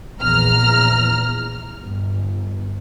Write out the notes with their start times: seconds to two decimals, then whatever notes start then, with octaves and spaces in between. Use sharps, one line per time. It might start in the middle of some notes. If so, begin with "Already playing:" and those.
0.20 A#1 E2 A#5 F6
1.78 G1